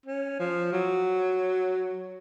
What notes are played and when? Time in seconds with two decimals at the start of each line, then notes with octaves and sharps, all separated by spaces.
0.06 C#4
0.39 F3
0.73 F#3